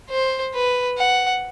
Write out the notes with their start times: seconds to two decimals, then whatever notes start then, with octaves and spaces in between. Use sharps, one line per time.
0.10 C5
0.54 B4
0.98 F#5